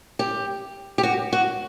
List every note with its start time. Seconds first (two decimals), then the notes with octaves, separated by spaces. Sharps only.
0.19 G4
0.98 G4
1.03 F#4
1.33 F#4